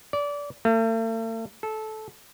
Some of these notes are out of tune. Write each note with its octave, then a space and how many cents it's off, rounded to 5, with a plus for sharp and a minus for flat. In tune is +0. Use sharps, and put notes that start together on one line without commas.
D5 -25
A3 +45
A4 -15